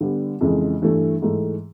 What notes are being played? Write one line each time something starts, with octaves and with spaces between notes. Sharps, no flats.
D3 G3 B3
F2 C#3 E3 G#3
G2 E3 A3
G#2 E3 A3